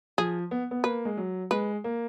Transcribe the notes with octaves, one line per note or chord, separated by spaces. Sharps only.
F3 G#4
B3
B3
A#3 B4
G#3
F#3
G#3 B4
A#3